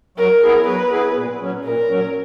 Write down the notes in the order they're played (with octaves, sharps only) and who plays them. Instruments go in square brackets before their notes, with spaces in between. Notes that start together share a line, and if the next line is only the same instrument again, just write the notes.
[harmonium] F#3 [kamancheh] A#4
[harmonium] B3 E4 G#4
[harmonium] F#3 [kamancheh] B4
[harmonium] B3 E4 G#4
A#2
F#3 C#4
[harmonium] A#2 [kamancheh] A#4
[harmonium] F#3 C#4